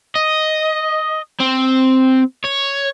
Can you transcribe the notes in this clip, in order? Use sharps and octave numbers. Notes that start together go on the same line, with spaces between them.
D#5
C4
C#5